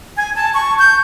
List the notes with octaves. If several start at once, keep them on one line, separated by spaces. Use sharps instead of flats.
G#5
A5
C#6
G6